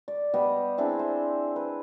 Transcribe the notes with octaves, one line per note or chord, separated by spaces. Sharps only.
D5
G3 B3 G4 D#5
C4 D4 E4 G#4
C5
B4